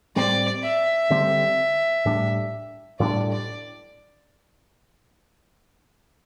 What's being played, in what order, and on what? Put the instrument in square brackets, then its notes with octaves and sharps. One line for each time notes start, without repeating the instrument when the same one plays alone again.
[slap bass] A2 G3 C4 [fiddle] D5
[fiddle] E5
[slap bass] D3 G3 C4
A2 G3 D4
[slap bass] A2 G3 D4 [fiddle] D5
[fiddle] D5